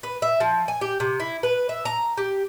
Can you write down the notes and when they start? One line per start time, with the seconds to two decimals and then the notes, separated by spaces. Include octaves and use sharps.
0.03 B4
0.22 E5
0.40 F3
0.68 G#5
0.81 G4
1.00 C3
1.20 E4
1.43 B4
1.69 E5
1.85 A#5
2.17 G4